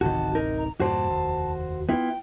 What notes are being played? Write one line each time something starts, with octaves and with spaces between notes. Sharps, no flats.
D1 A1 C3 D#3 F#4 A5
D#4 A#4
A#5
E2 G2 A#2 F#4 C5 A5
F1 D#2
B3 E4 F4 G5